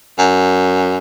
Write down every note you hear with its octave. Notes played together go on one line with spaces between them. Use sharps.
F#2